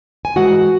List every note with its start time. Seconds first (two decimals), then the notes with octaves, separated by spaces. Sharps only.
0.25 G#5
0.36 G#2 E3 G#3 F#4 F#5